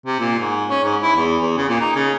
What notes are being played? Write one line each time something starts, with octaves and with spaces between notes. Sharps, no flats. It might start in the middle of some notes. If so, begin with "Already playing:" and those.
C3
A#2
G#2
C#4
G#2
E4
E2
E2
C#3
A#2
D#4
C#3